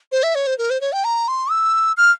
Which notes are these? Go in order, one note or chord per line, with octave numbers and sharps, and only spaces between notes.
C5
E5
C#5
C5
A#4
C5
C#5
G5
A#5
C6
E6
F6